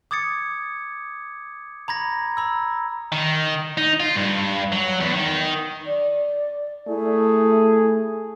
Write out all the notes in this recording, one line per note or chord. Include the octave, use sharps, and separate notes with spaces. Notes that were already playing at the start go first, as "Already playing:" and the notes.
D6 D#6 G#6 A6 C#7
A#5 B5 G#6 A#6
A#5 B5 E6
D#3
D#4
F4
G2
F#3
E2
D#3
D5
A3 E4 G#4